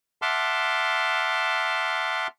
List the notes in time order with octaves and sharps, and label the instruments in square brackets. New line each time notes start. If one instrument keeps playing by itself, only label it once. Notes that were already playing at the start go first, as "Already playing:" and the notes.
[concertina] E5 F#5 A5 C6 D6 F6